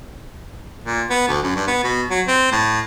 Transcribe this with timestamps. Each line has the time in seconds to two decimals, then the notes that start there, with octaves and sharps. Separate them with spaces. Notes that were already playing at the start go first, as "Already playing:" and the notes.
0.84 A#2
1.10 B3
1.28 D2
1.44 F#2
1.55 G2
1.68 B3
1.84 B2
2.11 F#3
2.28 C4
2.52 A2